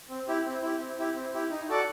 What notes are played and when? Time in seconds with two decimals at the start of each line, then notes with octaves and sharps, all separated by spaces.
0.09 C4
0.28 E4 G4
0.45 C4
0.62 E4 G4
0.80 C4
0.99 E4 G4
1.16 C4
1.34 E4 G4
1.51 D#4
1.68 F#4 A4 D5 F#5